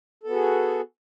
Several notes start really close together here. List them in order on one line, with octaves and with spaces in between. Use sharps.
A4 B3 F#4 G#4